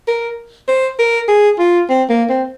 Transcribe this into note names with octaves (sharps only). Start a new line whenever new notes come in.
A#4
C5
A#4
G#4
F4
C4
A#3
C4